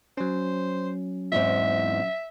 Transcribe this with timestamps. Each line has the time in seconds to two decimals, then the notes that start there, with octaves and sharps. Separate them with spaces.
0.17 F#3 C#4 C5
1.32 E2 G#2 C4 E5